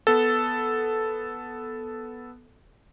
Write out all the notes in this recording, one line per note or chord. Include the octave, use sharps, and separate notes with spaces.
B3 A4